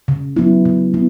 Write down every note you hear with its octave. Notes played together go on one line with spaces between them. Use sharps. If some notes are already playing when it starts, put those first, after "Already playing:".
C#3
F#3 B3 E4
C#3
B3 E4